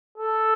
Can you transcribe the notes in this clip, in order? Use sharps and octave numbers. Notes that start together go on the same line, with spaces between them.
A4